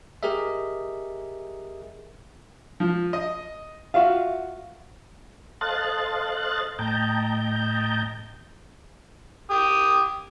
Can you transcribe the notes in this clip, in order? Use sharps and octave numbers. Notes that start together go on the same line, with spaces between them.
G4 G#4 A#4 D#5 E5
F3
D#5
F4 F#4 E5 F5
A4 C5 D#5 F5 F#6 A6
A2 D#5 G5 A5 A#5 G6
G4 D#6